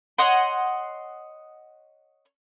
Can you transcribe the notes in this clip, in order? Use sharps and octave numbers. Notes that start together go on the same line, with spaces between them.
C#5 D#5 F#5 C6